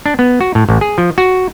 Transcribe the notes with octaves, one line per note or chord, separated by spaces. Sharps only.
D4
B3
F#4
A2
A1
G#4
F3
F#4